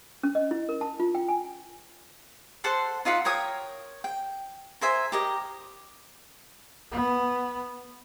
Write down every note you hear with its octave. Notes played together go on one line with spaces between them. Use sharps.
C#4
D#5
E4
A#4
A5
F4
G5
G#5
A4 C5 F#5 C6
D#4 F4 E5 F#5
A#4 C#5 G5 D#6
G5
A#4 C5 E5 G#5
G4 A#4 D#5
B3